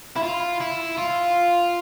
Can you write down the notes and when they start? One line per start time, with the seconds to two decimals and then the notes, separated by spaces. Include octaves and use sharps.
0.16 E4
0.23 F4
0.60 E4
0.97 F4